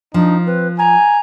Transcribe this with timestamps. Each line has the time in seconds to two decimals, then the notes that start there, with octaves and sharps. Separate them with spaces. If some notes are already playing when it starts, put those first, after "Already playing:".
0.14 F3 D4 D#4
0.46 C4 B4
0.79 G#5 A#5